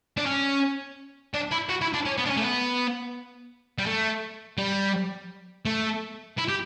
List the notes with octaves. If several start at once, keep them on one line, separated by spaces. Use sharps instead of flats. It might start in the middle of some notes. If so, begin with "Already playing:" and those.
D4
C#4
D4
E4
F#4
E4
D4
C#4
B3
D4
C#4
A3
B3
G3
A3
G3
A3
E4
G4